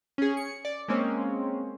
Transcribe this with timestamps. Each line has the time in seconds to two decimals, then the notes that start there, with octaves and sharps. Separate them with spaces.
0.18 C#4 G#4
0.37 C#7
0.65 D5
0.88 G#3 A#3 C4 C#4